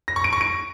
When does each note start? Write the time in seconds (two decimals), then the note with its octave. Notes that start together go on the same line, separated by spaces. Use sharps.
0.08 A#6
0.16 C#6
0.24 D7
0.33 C#6
0.41 D7